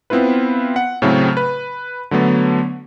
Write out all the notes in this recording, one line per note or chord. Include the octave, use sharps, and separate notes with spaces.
B3 C4 E4 F4 B4
F#5
A2 C#3 F#3 A3 C4
B4
D3 F#3 A3 B3